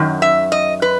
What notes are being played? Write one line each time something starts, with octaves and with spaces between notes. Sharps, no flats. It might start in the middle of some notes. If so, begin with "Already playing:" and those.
Already playing: F#2 D#3
E5
D#5
B4